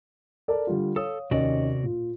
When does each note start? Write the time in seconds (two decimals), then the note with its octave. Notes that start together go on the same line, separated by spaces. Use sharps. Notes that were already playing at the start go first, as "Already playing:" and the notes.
0.48 A4 A#4 D5
0.67 D3 G3 F4
0.96 A4 C#5 F5 D#6
1.31 D#2 C3 C#4 F#4 D5 D#5
1.83 A#2 F4